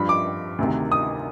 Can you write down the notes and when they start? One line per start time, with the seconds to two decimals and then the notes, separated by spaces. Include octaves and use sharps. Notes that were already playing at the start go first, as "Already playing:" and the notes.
Already playing: G2 F3 B5
0.09 D6
0.58 D2 C3 D#3
0.92 D#6